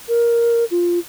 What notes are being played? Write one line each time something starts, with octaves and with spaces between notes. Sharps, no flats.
A#4
F4